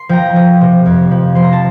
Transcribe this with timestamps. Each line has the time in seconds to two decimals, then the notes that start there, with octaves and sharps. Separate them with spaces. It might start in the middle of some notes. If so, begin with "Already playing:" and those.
Already playing: C6
0.09 F3 G5 A#5
0.36 F3
0.61 C3
0.86 F2
1.11 F3
1.35 F3 C6
1.44 A#5
1.52 A5